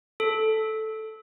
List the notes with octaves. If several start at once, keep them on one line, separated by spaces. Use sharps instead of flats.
A4